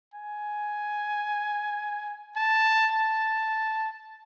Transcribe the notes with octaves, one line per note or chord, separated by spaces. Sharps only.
G#5
A5
A5